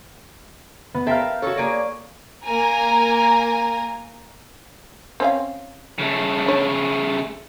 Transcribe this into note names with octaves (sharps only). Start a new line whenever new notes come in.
B3
A4 A#4 C5 E5 F5 G5
F#4 A4 C#5
A#3 G#4 D5
A#3 A#4 G#5 A#5
C4 C#4 F5
C#3 A3
D4 C#5